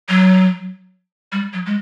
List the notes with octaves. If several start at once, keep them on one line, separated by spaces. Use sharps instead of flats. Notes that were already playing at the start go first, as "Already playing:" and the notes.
F#3
G3
F#3
G#3